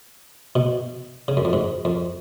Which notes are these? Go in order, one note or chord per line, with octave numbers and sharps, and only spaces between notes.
B2
C#3
F#2
F2
G#2
F2